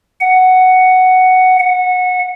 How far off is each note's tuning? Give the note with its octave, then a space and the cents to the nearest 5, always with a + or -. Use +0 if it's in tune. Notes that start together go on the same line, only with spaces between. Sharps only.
F#5 +5
F#5 -20